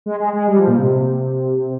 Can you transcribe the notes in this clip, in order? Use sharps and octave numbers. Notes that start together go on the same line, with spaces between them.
G#3
G#3
G#3
G3
F3
A#2
C3